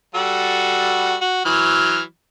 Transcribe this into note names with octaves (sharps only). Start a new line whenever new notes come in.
G3 F#4 A4
F#4
E3 F#3 F6